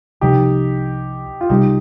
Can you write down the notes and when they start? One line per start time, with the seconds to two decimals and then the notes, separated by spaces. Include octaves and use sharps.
0.21 C2 C3 F3 D#4 G4
1.41 F4
1.49 C2 C3 G3 D#4 G4